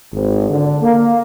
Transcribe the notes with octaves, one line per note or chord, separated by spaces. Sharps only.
G#1
D3
A#3